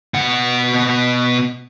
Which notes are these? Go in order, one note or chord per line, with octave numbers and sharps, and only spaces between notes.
B2 F#5